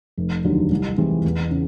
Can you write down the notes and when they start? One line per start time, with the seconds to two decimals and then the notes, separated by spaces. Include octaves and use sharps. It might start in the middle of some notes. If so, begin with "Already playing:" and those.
0.17 F1
0.44 D#2 D3 F#3
0.71 C2
0.98 C3 E3 G#3 C4
1.25 E2
1.51 C#3